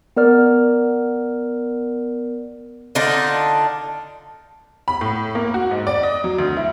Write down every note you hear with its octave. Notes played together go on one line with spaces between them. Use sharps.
B3 A#4 D5 F6
D3 D4 D#4 F4
B5
A2
A#3
F#4
G#2
D5
D#5
F#3
D2
E4